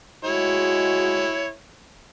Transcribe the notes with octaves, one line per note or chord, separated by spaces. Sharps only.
G#3 E4 F#4 C#5